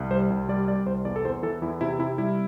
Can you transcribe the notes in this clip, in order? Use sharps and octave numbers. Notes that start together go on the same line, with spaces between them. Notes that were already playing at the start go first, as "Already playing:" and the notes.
Already playing: C2
G3 C5
C2
G3 D5
G3 D5
C2 C5
E2 D5
A4
E2 C5
E3 A4
E2 E4
C3 E4
C3 E4
G3 E4